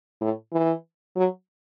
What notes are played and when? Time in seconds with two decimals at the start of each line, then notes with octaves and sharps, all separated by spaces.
0.21 A2
0.53 E3
1.16 F#3